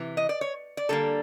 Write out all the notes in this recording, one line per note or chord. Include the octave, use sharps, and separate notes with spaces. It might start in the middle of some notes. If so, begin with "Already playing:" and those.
Already playing: C3 E3
D#5
D5
C#5
D5
D3 G3 A#3 A4